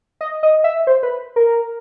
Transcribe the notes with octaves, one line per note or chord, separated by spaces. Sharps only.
D#5
D#5
E5
C5
B4
A#4